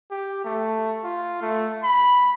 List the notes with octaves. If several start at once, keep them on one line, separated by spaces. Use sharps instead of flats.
G4
A3
F4
A3
B5